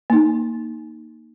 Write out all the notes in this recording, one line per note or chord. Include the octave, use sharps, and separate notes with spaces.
A#3 D#4